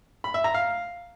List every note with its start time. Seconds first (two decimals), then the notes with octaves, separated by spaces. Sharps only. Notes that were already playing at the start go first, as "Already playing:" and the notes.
0.24 B5
0.34 E5
0.44 A#5
0.54 F5